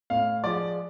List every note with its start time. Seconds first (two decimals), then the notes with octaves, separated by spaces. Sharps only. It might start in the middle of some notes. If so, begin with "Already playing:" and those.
0.10 A2 F5
0.43 F3 G#3 D5